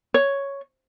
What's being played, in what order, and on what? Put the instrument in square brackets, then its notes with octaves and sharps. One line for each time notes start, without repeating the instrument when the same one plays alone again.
[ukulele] C#5